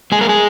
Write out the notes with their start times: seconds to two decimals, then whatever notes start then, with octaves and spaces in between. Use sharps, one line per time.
0.12 G#3 G#4
0.21 A#4
0.29 G#4